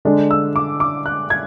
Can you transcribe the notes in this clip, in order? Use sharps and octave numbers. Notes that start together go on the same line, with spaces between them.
D3 G#3 D4
E6
D6
D6
F#6
G#6